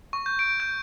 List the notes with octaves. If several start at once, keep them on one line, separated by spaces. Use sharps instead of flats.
C#6
G6
D7
G6